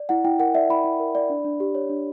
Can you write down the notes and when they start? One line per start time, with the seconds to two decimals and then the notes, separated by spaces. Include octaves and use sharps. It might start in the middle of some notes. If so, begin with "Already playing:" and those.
Already playing: D5
0.09 E4 F#5
0.25 E4 G5
0.39 A#4 F#5
0.54 D5 E5
0.70 E4 B5
0.84 E4
1.00 A#4
1.15 D5
1.30 D4
1.45 D4
1.60 G4
1.75 C#5
1.90 D4